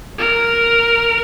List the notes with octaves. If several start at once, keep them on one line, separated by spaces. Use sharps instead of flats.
A#4